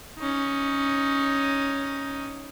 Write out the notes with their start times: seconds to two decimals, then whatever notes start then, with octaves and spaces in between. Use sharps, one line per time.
0.18 C#4 D#4